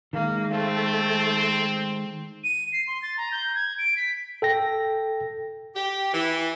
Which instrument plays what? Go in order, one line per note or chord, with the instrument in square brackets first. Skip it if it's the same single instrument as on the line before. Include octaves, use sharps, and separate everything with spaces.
[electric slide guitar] D#3 G#3 [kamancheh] A#3
[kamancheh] A3 [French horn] C4
[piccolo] D#7
C7
C6
A6
A#5
G6
G#6
D7
B6
[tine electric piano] A4 G5 A#6
[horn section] G4
E3